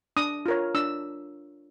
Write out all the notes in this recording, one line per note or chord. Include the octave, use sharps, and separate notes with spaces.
D4 D#6
F4 A#4 C#5
D4 E6